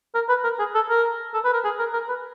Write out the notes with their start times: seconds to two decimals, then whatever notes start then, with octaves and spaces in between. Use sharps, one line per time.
0.15 A#4
0.29 B4
0.44 A#4
0.59 G#4
0.75 A4
0.89 A#4
1.34 A4
1.44 B4
1.53 A#4
1.64 G#4
1.79 A#4
1.93 A#4
2.09 B4